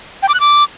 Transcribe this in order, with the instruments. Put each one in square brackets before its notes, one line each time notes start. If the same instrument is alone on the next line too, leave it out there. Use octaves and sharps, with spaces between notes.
[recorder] G5
D6
F#6
D6